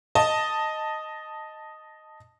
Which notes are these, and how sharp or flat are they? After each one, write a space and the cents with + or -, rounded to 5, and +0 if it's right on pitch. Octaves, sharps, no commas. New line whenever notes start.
D#5 +0 A5 +5